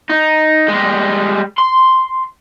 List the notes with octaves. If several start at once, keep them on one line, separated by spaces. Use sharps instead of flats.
D#4
G3 G#3
C6